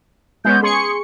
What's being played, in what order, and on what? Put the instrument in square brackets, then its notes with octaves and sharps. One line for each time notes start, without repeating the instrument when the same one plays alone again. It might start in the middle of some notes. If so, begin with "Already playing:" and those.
[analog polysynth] G#3 B3 C#4 [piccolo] G6
[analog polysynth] G#4 C#6 C#7 [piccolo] C6